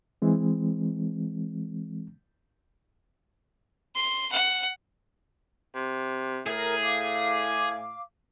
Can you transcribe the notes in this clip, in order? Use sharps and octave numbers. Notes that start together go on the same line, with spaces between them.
E3 G#3 C4
C6
F#5
C3
A2 G#4 A#4
F5 D6